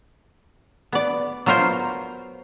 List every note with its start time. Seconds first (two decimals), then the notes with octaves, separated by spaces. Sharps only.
0.92 B3 D5
1.46 F#3 B3 F4 A#4 C5